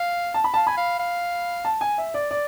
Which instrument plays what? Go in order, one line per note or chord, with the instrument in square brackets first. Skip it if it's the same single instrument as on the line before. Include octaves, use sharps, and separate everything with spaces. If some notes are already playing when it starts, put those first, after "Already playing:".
Already playing: [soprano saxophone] F5
[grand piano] A5
B5
[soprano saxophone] F5 [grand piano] A5
[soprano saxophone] G#5 [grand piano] B5
[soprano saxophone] F5
F5
[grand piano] A5
G#5
E5
D5
D5